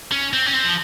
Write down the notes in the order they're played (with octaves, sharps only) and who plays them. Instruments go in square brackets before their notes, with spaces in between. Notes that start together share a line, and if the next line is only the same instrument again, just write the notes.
[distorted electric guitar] C#4
C4
C#4
C4
F3